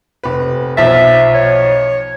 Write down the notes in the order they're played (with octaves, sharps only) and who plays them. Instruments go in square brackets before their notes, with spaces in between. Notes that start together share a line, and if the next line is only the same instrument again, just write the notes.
[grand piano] F1 B4
[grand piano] B1 F3 A6 [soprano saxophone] E5
[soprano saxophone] C#5